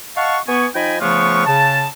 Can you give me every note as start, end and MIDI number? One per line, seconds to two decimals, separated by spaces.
0.17 0.38 75
0.17 0.38 77
0.17 0.38 78
0.17 0.38 81
0.17 0.38 85
0.48 0.66 59
0.48 0.66 80
0.48 0.66 85
0.75 0.96 53
0.75 0.96 63
0.75 0.96 75
0.75 0.96 79
0.75 0.96 80
0.75 0.96 83
1.01 1.44 49
1.01 1.44 53
1.01 1.44 57
1.01 1.44 59
1.01 1.44 65
1.01 1.44 85
1.46 1.86 49
1.46 1.86 81